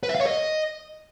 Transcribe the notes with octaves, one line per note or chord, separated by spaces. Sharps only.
B4
E5
F5
C#5
D#5